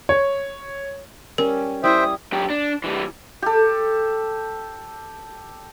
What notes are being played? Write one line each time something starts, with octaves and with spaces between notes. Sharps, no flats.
C#5
G3 C#4 A#4
G3 E4 C5 E5 G5 C#6 D#6
F#2 G4
D4
E3 G3
G4 A4